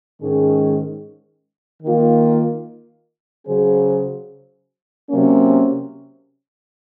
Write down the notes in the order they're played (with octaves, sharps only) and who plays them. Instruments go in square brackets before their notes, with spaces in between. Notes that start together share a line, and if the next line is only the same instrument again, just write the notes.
[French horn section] G#2 D#3 G#3 C#4 G#4
D#3 A#3 F4
C#3 F#3 C#4 G#4 C5
C3 F#3 A#3 C#4